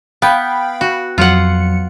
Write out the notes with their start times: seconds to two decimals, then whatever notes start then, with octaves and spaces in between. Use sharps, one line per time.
0.22 B3 F5 G5 B5
0.81 F#4
1.18 F2 F#3 F4 F#5 C#7